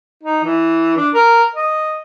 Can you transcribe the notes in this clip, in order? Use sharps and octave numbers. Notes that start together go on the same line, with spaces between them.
D#4
E3
D4
A#4
D#5